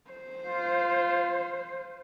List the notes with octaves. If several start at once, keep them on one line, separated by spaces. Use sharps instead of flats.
C5
F4